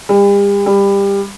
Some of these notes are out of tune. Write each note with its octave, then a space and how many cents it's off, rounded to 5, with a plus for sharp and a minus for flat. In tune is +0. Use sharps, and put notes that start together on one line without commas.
G3 +40
G3 +20